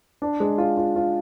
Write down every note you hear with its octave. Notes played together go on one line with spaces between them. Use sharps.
D4
G#3
F4
F4
F4